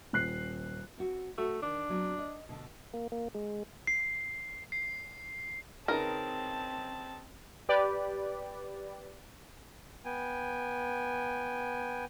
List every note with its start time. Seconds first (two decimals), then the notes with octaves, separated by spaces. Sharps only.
0.13 D#1 F#6 C7
0.98 C4 F#4
1.38 A3 F#4
1.62 D#3 D4
1.89 F#3 B3 C4
2.18 D#5
2.49 B2 D3
2.94 A#3
3.12 A#3
3.35 G#3
3.87 C7
4.72 C7
5.88 C#3 C4 D#4 A#4 B4 A5
7.69 G4 B4 D5
10.05 B3 G5 G#5